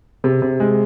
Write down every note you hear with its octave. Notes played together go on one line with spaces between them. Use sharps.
C3
C3
G#3